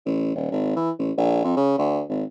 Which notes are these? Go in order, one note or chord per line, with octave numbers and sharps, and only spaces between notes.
A1
D#1
G#1
E3
A1
A#1
F2
C#3
D2
G#1